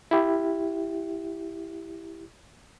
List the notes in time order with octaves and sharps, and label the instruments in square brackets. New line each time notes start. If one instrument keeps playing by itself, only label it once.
[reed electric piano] E4 G4